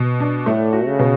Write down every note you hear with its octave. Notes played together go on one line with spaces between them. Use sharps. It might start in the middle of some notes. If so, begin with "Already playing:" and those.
Already playing: B2
D4
A2 A3
F#4
C#3
B2